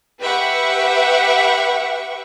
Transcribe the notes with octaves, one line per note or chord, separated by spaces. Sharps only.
G4 B4 E5 F#5 C#6